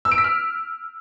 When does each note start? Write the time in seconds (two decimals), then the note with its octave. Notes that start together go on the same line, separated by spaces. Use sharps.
0.05 E6
0.12 D7
0.18 B6
0.24 F6